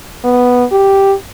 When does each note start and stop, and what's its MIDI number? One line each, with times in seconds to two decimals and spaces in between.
0.24 0.64 59
0.72 1.14 67